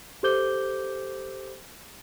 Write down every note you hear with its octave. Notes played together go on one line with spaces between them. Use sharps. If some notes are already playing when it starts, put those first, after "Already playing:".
G4 A4 C5 D6 G6 G7